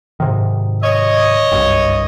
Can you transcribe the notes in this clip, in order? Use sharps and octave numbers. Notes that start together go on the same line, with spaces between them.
G#2 C3 D#3
C#5 D#5
F#1 C2 G2